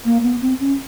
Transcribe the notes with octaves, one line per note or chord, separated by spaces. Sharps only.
A#3
B3
C4
C#4